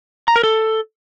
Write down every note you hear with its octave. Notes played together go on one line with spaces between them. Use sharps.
A#5
A#4
A4